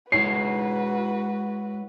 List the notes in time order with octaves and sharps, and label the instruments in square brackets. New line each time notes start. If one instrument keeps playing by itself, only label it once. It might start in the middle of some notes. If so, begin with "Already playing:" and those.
[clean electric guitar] G#3 E4 C#5 [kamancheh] F#4 B4 [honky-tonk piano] C7